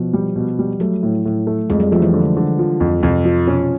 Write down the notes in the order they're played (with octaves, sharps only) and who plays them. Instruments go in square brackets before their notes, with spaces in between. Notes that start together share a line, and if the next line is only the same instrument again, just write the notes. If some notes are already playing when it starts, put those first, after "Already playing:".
Already playing: [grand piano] B2 [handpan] F3
[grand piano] G3
B2
G3
[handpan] F#3 [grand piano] A3
[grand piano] A2
A2
A3
[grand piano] F2 [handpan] G#3
[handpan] G3
[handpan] F3 [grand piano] A3
[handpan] E3
[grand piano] D3
D3
F3
F2
[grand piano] F2 [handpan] C3
[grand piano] F3
[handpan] B2 [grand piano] C#4